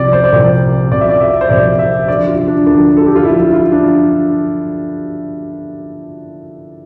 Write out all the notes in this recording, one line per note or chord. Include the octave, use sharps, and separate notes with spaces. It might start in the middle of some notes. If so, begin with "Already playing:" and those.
Already playing: C2 C3 F3 D5
C5
D5
C2 C3 F3 C5
C2 C3 F3 D5
E5
D5
E5
C5
C2 C3 F3 D5
E5
D2 D3 F3 D5
F4
D4
D2 D3 F3 D4
A4
G4
F4
D2 D3 F3 E4
F4
D4